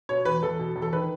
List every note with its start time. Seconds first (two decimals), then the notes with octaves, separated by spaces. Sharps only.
0.09 B2 C#5
0.25 E2 B4
0.43 E2 A4
0.59 B2
0.76 E2
0.82 A4
0.92 D#3 B4